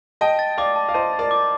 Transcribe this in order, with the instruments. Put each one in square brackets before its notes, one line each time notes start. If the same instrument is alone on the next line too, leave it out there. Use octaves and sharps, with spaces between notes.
[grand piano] D#5 G5 [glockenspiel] A5
[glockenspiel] A6
[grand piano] D5 F5 [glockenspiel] D6
[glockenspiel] A5
[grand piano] F5
[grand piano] C5 D#5 [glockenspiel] A5
[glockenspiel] A6
[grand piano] A#4 D5
[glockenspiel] D6